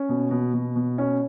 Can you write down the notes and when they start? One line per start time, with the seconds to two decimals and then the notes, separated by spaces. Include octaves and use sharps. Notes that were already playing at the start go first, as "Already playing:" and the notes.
Already playing: C#4
0.09 B2
0.31 B2
0.54 B2
0.76 B2
0.98 C#4